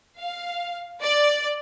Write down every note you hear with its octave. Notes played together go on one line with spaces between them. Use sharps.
F5
D5